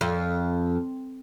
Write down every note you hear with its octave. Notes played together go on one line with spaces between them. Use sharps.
F2